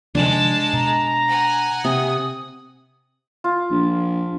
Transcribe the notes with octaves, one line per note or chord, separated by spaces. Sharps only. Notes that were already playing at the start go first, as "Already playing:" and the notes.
C3 D#3 F3 G#3 D4 A5
B2 A#5
F#5 G#5
C3 D#6
F4
A#1